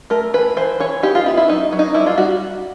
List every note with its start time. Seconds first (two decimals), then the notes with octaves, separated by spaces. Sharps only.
0.10 A3 A#4
0.33 E3 B4
0.57 E3 C5
0.80 E3 C#5
1.03 D#4 G4
1.15 F4
1.26 B3 E4
1.37 E4
1.48 F#3 D#4
1.73 F#3
1.79 D#4
1.94 G3 E4
2.07 F4
2.18 G3 F#4